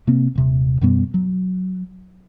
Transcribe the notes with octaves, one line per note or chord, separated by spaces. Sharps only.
C3 A#3 C4
D#1 C3
F#2 B2 G3 B3
F#3